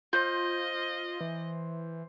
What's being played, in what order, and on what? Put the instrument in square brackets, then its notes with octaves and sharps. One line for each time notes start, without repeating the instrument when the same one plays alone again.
[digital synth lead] F4 [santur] C5 [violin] D#5 [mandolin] G6
[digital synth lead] E3